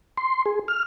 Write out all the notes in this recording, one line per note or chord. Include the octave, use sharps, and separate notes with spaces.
C6
G#4
F6